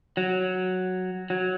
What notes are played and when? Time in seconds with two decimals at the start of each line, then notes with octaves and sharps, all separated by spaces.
0.17 F#3
1.30 F#3